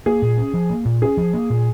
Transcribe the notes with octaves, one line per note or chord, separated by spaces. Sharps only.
A#3 G#4
A#2
C#4
F3
A#3
A#2
C#4 G#4
F3
A#3
A#2